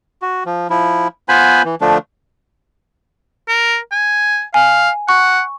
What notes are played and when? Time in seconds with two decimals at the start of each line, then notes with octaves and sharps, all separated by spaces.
0.22 F#4
0.46 F3
0.70 F3 E4
1.29 B3 F4 B4 C5 G#5 B5
1.65 E3
1.81 D3 F3 A3 D4
3.48 A#4
3.92 G#5
4.54 F5 G#5
5.09 F#5 C#6